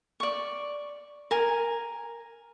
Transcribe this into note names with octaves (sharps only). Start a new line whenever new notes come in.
D5 C#6
A#4 G#5